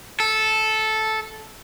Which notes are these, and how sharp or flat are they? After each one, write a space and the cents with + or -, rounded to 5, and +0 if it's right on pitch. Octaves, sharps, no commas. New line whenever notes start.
A4 -10